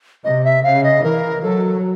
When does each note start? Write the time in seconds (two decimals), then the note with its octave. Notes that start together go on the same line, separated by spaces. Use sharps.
0.24 C3 D#5
0.44 E5
0.64 C#3 F5
0.84 D#5
1.04 E3 A#4
1.43 F#3 A4